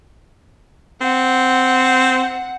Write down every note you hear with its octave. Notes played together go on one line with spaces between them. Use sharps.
C4 F#5